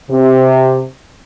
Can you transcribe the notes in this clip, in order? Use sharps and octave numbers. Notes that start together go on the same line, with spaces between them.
C3